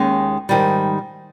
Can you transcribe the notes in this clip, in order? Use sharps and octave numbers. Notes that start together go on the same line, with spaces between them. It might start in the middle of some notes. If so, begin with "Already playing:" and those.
Already playing: D#2 D#3 G#3 C#4
G#2 D#3 G3